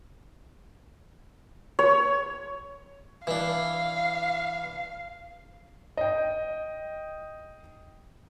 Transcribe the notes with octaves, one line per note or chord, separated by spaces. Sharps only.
C#5
E3 D4 F5
D#5 G5